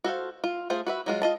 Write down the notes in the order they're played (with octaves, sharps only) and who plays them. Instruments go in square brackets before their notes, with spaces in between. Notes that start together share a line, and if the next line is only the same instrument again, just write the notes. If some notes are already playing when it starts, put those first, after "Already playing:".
[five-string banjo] F#4 A4 C5 F5
F4
A3 F4 G#4 C5
F#4 B4 E5
F#3 G#3 F4
F4 D#5 A5